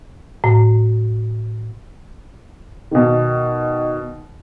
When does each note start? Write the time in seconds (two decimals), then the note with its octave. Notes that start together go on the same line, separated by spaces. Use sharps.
0.44 A2
2.91 B2 D#3